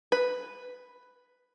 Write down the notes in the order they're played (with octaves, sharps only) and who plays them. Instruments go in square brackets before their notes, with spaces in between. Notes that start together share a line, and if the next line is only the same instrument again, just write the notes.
[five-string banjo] B4